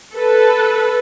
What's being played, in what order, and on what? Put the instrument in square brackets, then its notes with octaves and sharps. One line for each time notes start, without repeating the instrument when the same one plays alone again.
[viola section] A4 B4